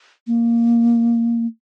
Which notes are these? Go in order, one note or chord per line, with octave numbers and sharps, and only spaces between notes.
A#3